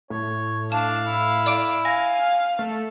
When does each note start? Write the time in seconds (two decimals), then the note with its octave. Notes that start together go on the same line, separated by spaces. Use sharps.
0.10 A2 C#5
0.72 D4 F5 A5
1.06 E4
1.46 D5 D6 D7
1.85 F5 G#5 A#6
2.59 A3 A4